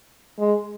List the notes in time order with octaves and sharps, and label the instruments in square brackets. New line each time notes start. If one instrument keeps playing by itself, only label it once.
[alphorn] G#3